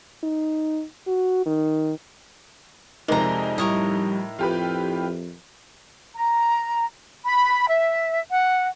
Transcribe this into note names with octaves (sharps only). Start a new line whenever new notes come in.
D#4
F#4
D#3
F2 C3 G#3 D#4 A#4 D5 A#5
A2 G3 A#4 C#5 D#5
F2 F4 G4 B4
A#5
B5
E5
F#5